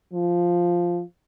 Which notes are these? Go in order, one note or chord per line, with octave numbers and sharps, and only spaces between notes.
F3